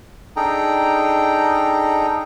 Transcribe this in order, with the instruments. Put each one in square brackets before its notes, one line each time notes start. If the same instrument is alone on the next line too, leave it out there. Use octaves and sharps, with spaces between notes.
[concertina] D4 D#4 G#4 A4 G5 A#5